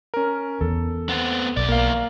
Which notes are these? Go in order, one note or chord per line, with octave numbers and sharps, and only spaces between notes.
C#4 A#4
E2 A4
B3 C4
B1 E2 D5
A#3 F5